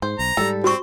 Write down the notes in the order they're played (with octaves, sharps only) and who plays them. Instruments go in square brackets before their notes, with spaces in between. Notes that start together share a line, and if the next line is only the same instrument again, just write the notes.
[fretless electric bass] G#2 [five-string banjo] C5
[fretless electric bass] B1 [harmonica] A#5
[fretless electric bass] G#2 F#3 G3 [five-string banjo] A4
[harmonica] C4 [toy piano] F#4 C#6